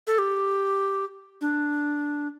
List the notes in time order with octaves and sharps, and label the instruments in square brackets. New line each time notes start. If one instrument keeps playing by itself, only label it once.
[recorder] A4
G4
D4